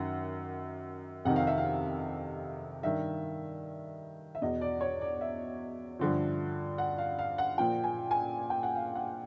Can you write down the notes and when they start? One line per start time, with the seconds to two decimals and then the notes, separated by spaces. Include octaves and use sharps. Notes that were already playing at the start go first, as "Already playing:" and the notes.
Already playing: F#2 D#3 F#5
1.25 F2 C3 D#3 F#5
1.36 F5
1.47 E5
1.58 F5
2.83 G2 D#3 E5
4.35 E5
4.42 E2 B2 D#5
4.61 D5
4.81 C#5
5.01 D5
5.21 E5
5.99 G2 D3 F3
6.78 F#5
6.98 F5
7.19 F5
7.38 F#5
7.57 A#2 F3 G5
7.84 G#5
8.11 G#5
8.50 G5
8.63 F#5
8.76 F5
8.96 F#5